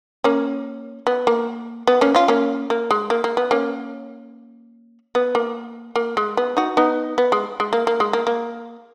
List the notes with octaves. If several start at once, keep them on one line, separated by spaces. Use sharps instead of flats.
A#3 C#4
B3
A#3
B3
A#3 C#4
C#4 F4
A#3 C#4
A#3
G#3
A#3
A#3
B3
A#3 C#4
B3
A#3
A#3
G#3
B3
D#4 F#4
B3 D#4
B3
G#3
G#3
A#3
A#3
G#3
A#3
A#3